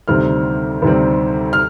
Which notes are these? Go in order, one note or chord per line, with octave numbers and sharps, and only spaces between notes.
D2 C3 D#3 G3 C4 F6
D2 C3 D#3 G3 C4
F6